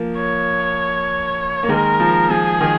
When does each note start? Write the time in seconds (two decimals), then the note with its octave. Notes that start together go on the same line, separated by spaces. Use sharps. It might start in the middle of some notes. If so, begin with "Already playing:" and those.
Already playing: F3 A#3
0.16 C#5
1.63 A#3
1.69 D#3 G#3 A#4
2.00 F3
2.30 F3 G#4
2.61 D#3